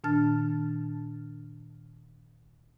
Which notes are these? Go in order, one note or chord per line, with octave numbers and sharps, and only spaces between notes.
A#2 D#3 D4 A5 F6 A6